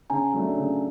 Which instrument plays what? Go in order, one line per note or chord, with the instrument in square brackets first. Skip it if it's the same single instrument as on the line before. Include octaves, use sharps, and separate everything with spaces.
[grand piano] C#3 [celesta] G#5 A#5
[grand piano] F#3 A3 D4
C#3